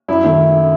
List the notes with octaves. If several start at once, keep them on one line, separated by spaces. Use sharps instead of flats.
F#2 E4
D#3 A3